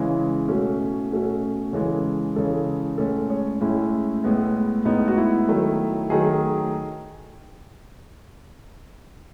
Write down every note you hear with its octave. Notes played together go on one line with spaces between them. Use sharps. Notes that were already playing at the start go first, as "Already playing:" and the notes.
Already playing: C#3 E3 G#3 E4
B2 A3 C#4
B2 A3 C#4
C#3 E3 G#3 A4
C#3 E3 G#3 A4
A2 G#3 C#4 A4
C#5
A2 G#3 C#4 E4
A2 G#3 B3
A2 G#3 B3 D#4
F#4
E4
D#3 F#3 A3
D#3 F#3 A3 G#4